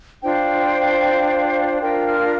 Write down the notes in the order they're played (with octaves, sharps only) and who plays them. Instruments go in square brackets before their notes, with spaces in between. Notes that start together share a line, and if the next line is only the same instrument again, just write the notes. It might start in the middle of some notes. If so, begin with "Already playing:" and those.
[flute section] D4 F4 C5 G5
D4 F4 A#4 G5
F6